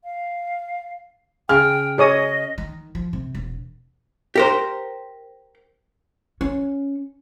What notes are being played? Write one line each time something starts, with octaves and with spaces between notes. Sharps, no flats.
F5
C#3 G5 F6
G#4 C#5 D#5 D#6
D#3
F3
C3
E1
G4 A#4 C5
C#4